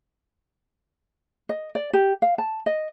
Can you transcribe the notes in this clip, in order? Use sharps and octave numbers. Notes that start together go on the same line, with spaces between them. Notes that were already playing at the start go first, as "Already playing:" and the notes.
D#5
D5
G4
F5
A5
D#5